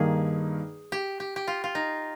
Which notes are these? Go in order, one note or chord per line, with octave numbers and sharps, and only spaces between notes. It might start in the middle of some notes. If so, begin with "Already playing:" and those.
Already playing: G2 D#3 A#3 G#4
G4
G4
G4
F4
F4
D#4